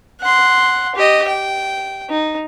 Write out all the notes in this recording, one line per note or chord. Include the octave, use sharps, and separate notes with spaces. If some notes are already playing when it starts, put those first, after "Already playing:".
F#5 C6
G4 D#5
G5
D#4